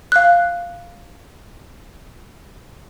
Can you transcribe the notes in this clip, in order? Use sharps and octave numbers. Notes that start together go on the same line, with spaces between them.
F5 F#6